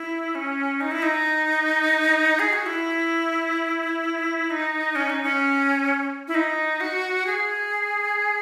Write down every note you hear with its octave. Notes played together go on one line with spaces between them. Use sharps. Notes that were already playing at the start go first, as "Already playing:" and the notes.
Already playing: E4
C#4
D#4
E4
D#4
G#4
F#4
E4
D#4
C#4
D#4
C#4
E4
D#4
F#4
G#4